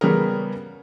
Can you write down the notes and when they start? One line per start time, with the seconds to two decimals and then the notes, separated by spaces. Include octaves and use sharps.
0.01 C#3 G3 B3 C#4 G#4 A#4